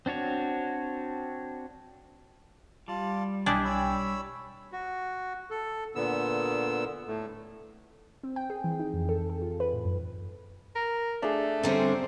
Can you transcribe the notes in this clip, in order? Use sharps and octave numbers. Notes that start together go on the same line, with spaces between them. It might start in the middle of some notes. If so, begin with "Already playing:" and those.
C4 D4 F#4 C#5
G3 F4 A5
B1 D4 E4 D#5 G5 G#5
C#5 B5 E6
F#4
A4
A#2 D3 B3 E6
A2 A3
C4
G5
G#4
E3
D#4
F2
A4
A4
F4
B4
A2
F#2
A#4
A3 D4 G#4 C#6
D3 G3 C4 C#4 C5 A#5 E6